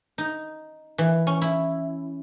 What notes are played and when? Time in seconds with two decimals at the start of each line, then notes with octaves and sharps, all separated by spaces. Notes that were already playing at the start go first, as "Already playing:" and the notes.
0.18 D#4
0.98 E3
1.27 C#4
1.42 E4